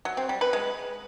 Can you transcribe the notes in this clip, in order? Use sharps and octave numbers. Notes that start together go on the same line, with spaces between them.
F#3
C4
G3
B4
G#3